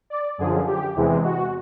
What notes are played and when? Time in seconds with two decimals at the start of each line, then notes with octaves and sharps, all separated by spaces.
0.10 D5
0.38 F#2 D3 F3 G#4
0.67 G4
0.96 E2 C3 E3 G#3
1.24 F#4